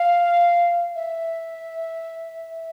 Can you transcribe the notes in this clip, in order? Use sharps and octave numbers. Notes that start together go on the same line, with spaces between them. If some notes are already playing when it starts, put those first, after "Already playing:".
Already playing: F5
E5